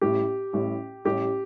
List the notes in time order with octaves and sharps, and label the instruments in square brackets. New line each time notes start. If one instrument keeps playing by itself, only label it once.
[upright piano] A1 A2 G3 [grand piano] G4
[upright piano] A1 A2 G3
[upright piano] A1 A2 G3 [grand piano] G4